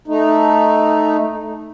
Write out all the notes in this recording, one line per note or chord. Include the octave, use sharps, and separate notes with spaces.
A3 D#4